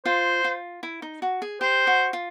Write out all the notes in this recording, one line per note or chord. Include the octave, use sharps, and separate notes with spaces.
F4 C5
F4
E4
D#4
F#4
G#4
G4 C5
F#4
F4